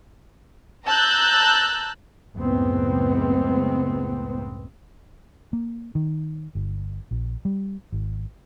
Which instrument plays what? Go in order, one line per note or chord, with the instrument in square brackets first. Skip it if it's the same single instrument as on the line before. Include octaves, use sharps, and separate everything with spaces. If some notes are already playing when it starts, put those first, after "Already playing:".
[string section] A5 A#5 E6 F#6 G6
[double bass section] F#1 C#2 A2 B3 C4
[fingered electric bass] A#3
D#3
G1
A#1
G3
G#1